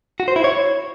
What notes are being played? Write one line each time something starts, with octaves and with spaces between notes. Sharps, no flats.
F#4
C5
E4
C#5